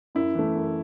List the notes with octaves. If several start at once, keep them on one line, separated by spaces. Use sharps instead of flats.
F#2 E4
E3 A3
F#2